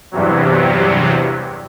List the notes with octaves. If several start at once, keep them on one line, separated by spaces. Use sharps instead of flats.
E2 G2 C3 F#3